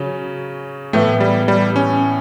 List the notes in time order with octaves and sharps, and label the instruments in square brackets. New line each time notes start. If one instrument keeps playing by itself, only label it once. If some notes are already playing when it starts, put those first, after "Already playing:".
Already playing: [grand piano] C#3 F#3 C#4
[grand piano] A2 E3 B3 E4 [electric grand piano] A3
[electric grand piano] G3
G3
C#4